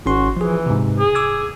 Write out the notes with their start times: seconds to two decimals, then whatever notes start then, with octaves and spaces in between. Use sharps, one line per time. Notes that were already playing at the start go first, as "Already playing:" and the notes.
0.06 G#1 C#4 F#4 C6
0.37 E3 F3 G#4
0.66 G#2 C3
0.99 G#4
1.15 D6 E6 G#6